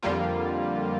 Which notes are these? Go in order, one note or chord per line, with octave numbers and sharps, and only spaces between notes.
F2 D3 G3 A#3 F4